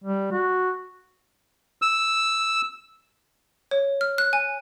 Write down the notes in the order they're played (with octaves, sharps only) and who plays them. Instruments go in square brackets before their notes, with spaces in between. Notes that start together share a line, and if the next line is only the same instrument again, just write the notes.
[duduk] G3
F#4
[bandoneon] E6
[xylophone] C#5
F6
F#6
G#5